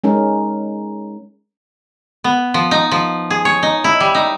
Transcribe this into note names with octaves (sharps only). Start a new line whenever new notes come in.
G#3 C#4 D#4 A#4
B3
F3
D#4
F3
G#4
C#5
D#4
E4
G3
D#4